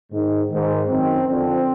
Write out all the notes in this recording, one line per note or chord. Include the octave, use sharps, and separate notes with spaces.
G#2 D#3
G#2 D#3
F#2 D#3 C4
F2 D3 C4